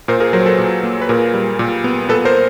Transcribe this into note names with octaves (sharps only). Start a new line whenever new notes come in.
A#2 A#4 C5
G#4 A#4
F#3 A#4 C5
A4 B4
A#2
A#3
B4
A#2 G#4 A#4
G3
A#2
B3
A#2 A4 B4
A#4 C5